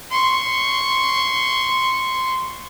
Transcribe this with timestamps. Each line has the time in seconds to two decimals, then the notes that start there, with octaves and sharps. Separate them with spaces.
0.11 C6 C#6